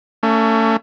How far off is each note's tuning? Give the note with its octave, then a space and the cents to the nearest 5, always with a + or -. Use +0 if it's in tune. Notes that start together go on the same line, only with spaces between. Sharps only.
A3 +30 C#4 +30